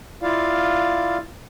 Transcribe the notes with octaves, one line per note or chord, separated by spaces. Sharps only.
E4 F4 D5 F5